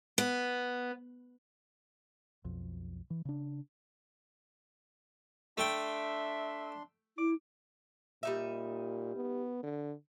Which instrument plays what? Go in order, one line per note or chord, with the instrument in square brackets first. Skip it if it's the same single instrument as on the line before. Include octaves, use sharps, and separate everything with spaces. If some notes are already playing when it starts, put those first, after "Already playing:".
[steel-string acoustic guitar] B3
[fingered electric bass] B1 F2
E3
C#3 D4
[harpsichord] A3 G5 [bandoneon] D4 C6 [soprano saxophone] E5
[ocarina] E4 [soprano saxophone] D6
[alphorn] A#2 [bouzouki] G3 D#4 E5
[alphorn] B3
D3